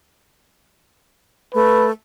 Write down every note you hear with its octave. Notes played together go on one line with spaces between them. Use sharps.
A3 B4